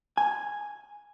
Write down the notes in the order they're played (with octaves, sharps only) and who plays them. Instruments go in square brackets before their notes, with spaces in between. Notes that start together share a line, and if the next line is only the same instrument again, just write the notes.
[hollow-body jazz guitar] G#5